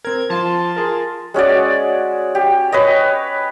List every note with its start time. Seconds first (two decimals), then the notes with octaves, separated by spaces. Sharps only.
0.05 C4 A#4 G#6
0.30 F3 F4 A5 C6
0.76 F4 G#4 A#4
1.34 G#3 C#4 F#4 D5
2.35 G4
2.72 B4 C#5 D#5